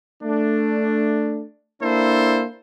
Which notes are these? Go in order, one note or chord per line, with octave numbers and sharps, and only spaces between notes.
A3 D4
A#3 D4 E4 A4 C5